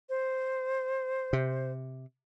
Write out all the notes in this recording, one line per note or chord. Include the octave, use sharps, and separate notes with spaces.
C5
C3